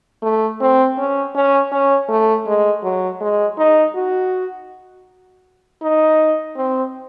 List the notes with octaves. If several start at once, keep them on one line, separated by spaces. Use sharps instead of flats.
A3
C4
C#4
C#4
C#4
A3
G#3
F#3
G#3
D#4
F#4
D#4
C4